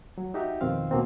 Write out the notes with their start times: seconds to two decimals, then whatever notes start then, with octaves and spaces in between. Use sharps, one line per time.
0.18 F#3
0.34 D#4 F#4 G4 E5
0.61 F2 B2 D#3 C4 F5
0.91 D2 B2 A#3 C4